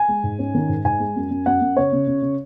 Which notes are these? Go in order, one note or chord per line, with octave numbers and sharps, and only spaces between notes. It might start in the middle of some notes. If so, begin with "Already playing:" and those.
Already playing: G#5
G#3
G#2
C#4
D#3
G#2
G#2 G#5
G#3
F#2
F#2
F#2 F#5
F#2
C#3 C#5
C#3
C#3
C#3